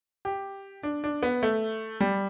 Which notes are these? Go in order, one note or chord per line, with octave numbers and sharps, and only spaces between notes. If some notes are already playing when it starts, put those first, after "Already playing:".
G4
D4
D4
B3
A3
G3